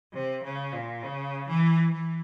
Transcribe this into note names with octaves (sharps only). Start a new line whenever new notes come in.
C3
C#3
A#2
C#3
E3
E3